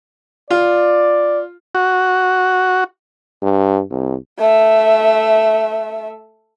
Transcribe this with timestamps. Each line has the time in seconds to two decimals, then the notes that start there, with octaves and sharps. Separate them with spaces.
0.50 F4 D5
1.75 F#4
3.42 G2
3.90 C2
4.38 A3 E5